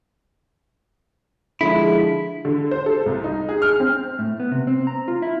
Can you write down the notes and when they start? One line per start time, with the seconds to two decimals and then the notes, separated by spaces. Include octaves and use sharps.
1.61 D3 F3 G#3 E4
2.45 D3
2.71 C5
2.86 A4
3.06 C2
3.24 D#4
3.49 G#4
3.62 F6
3.80 C4
4.19 A2
4.40 B3
4.52 C3
4.67 C4
4.87 A#5
5.08 F4
5.22 E4